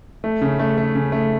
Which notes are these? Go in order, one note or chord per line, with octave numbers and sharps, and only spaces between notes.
A3
C#3
A3
A3
C#3
A3